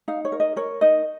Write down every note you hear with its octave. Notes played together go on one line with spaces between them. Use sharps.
D#4 F5
C#5
A#4
D#5
A#4 C#5
D#4 D#5